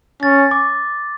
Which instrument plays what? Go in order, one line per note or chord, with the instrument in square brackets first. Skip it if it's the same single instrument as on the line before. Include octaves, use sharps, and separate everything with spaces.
[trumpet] C#4 [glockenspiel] A6
[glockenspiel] D6